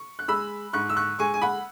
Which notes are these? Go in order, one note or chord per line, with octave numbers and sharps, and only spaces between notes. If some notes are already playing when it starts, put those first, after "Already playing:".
Already playing: C#6
F#6
G#3 B5 E6
G#2 C#6 F#6
E6
C#6 F#6
G#3 G#5 C#6
G#5
F#5 B5